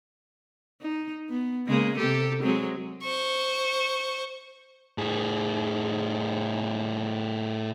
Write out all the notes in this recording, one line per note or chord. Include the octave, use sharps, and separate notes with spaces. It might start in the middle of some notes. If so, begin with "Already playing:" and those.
D#4
B3
C#3 G#3 A#3
C3 G4 A4
F#3 G#3 C4
C5 C#6
A2 G#4